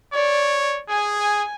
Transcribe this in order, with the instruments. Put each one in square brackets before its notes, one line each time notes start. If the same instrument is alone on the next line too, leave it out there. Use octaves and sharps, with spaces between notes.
[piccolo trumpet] C#5 [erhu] D5
[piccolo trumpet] G#4 [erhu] G#5